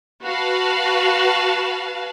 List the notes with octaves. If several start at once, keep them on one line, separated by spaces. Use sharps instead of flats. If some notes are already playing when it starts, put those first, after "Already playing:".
F#4 B4 F5 A5